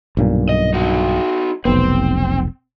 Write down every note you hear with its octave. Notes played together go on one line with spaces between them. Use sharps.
B1 G2 A#2
D#5
D#4 F#4
F1 B1 B3 C4